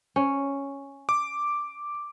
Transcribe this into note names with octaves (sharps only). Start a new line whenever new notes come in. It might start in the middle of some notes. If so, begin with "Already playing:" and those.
C#4
D6